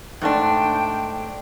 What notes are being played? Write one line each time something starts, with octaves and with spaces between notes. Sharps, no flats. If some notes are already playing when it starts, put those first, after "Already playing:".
G#2 A3 D4 G5